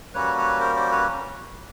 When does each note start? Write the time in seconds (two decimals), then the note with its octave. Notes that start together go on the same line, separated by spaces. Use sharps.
0.14 G3 A#3 C#4 F#4 B4 C#5
0.37 B4 C#5
0.60 A#4 C5
0.76 C5 D5
0.92 B4 C#5